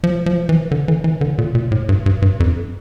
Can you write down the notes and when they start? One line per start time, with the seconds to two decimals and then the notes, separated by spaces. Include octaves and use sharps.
0.04 F3
0.26 F3
0.49 E3
0.71 D3
0.88 E3
1.04 E3
1.21 D3
1.38 A#2
1.55 A#2
1.72 A2
1.89 G2
2.06 G2
2.22 G2
2.40 F2